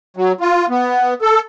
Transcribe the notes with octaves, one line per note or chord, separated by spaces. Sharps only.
F#3
F4
B3
A4